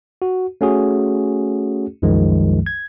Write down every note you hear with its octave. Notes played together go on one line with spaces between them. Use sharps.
F#4
A3 C#4 F#4 G#4
C2 F#2 D#3 F3 G#3
G#6